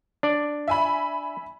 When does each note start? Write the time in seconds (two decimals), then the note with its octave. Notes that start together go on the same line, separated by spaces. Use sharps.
0.23 D4 D5
0.68 E5 G#5 B5